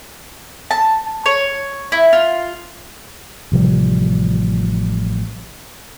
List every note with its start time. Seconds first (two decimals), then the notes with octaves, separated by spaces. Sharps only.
0.71 A5
1.26 C#5
1.92 E4
2.13 F4
3.52 A1 C3 F3 G3